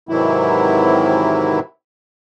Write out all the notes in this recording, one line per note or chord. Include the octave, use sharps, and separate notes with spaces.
G#2 C3 D#3 E3 F#3 E4